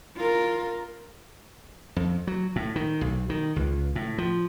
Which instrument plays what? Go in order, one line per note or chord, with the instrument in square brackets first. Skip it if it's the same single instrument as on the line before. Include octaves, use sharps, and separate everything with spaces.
[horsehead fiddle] F4 A#4
[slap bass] F2
F#3
A2
D#3
B1
D#3
C#2
A2
F3